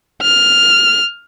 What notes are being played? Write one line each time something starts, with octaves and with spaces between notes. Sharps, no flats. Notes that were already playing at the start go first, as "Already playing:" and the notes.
F6